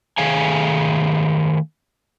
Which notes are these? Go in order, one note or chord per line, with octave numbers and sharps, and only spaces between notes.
D#3 A3 G#4 F5 G#5